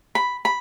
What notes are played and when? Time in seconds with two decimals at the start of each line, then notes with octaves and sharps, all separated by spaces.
0.15 B5
0.45 B5